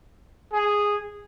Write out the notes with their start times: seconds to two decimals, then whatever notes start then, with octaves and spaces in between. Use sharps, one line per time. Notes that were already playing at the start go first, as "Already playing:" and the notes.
0.53 G#4